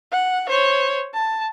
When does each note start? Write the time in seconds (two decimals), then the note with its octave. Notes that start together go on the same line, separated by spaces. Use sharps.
0.12 F#5
0.48 C5 C#5
1.14 A5